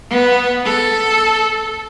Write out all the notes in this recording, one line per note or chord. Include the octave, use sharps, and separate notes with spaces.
B3
A4